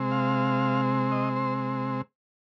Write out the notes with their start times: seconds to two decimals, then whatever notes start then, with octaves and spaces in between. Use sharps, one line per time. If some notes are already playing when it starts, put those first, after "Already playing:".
Already playing: C3 G#3 C4
0.11 F5
1.12 D#5
1.36 C5